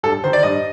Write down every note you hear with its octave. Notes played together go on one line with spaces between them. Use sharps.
G2 A4
D#3 C5
D5
G2 D#5